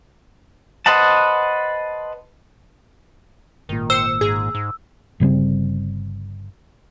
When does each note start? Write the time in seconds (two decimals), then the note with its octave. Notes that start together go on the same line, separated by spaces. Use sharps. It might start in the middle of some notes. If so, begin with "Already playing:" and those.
0.86 B4 C5 D#5 F#5 A5
3.69 G#1 A#2 D#3
3.90 C5 E6 C#7 E7
4.21 G#2 G#4 A#5
4.55 G#2
5.20 G1 C#3 G3 C4